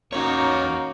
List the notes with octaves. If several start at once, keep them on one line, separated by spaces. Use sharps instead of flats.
E2 G#2 A#3 C#4 D#4 F#4 C#5